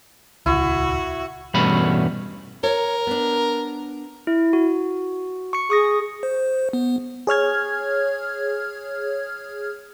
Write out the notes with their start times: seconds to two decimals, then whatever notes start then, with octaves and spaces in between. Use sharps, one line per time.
0.46 D#1 C#2 E4 F#4
1.54 E2 G2 B2 A3 C#4 B5
2.63 A#4 C#5
3.07 B3 D4
4.27 E4
4.53 F#4
5.53 C#6 C#7
5.70 G#4 C#6 D#6 A#6
6.23 C5
6.73 B3
7.27 G#4 C#5 F6 G#6